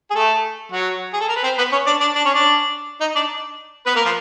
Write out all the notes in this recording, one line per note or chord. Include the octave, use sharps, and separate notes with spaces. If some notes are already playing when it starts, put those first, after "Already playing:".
G#4
A3 A4
F#3 F#4
G#4
A4
A#4
B4
C4 C5
B3 B4
C#4 C#5
D4 D5
D4 D5
D4 D5
C#4 C#5
D4 D5
D#4 D#5
D4 D5
B3 B4
A#3 A#4
F3 F4